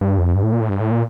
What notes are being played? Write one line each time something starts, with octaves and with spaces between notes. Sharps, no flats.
G2
F2
G2
A2
A#2
A2
G2
A2
A#2